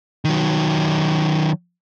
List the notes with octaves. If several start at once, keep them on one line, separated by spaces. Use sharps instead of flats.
D#3 F#3